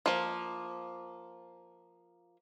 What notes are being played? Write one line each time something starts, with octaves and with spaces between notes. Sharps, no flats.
F3 A#3